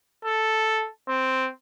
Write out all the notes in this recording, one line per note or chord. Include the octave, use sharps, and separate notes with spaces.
A4
C4